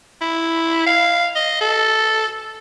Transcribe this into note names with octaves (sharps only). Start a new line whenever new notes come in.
E4
F5
D#5
A4